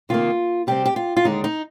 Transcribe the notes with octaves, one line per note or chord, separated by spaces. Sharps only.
C3 D#3 A#3 F4
C3 G3 C4 G4
G4
F4
F4
D#2 D3 G#3 D4 D#4
D#4